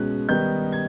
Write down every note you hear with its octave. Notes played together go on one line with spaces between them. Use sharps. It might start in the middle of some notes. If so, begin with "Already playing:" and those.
Already playing: B2 G#3 C#4 F#6
D#3 G3 B3 D#4 G6
G#6